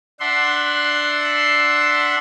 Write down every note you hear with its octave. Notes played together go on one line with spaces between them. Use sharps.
D4 E5 F#5 C6